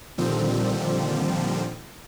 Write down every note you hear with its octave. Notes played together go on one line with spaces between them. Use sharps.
A#2 D3 D#3 F3 G3 C4